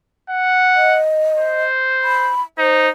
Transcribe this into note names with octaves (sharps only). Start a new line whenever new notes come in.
F#5
D#5
C5
B5
D#4 C5